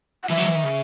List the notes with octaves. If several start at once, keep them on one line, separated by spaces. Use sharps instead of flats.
F#5
E3 E5
F#3
D#3
E3
D#3
C#3